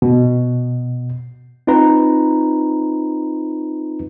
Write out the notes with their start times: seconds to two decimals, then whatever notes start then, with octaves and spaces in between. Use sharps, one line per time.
0.02 B2
1.67 C4 D#4 F4 B4 A#5